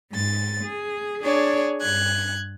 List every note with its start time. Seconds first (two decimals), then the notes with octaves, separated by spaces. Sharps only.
0.12 G#2 A6
0.63 G#4
1.22 D4 G#4 C#5 D5
1.80 G2 F#6 G#6